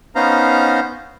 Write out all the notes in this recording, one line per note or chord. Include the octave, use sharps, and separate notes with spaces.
B3 C#4 D#4 C5 F5 A#5